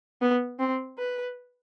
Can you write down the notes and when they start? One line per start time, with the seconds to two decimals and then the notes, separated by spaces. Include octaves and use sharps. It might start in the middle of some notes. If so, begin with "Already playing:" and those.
0.21 B3
0.59 C4
0.98 B4